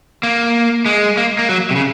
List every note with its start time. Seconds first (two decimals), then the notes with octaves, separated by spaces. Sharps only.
0.23 A#3
0.86 G#3
1.17 A#3
1.39 A#3
1.49 F#3
1.71 C3
1.76 C#3